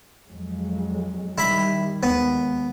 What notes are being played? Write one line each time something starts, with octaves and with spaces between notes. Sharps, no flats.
F2 F#3 G#3
D#3 G3 E4 B5
D#2 G#3 B3